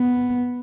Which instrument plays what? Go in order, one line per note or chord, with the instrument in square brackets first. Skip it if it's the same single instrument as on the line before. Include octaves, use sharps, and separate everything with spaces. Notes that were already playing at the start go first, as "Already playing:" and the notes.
Already playing: [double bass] B3